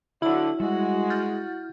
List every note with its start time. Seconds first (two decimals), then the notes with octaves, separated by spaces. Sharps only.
0.22 D3 F#3 E4 F#4 E6 F#7
0.60 G3 G#3 F#4
1.10 F6 G6 A6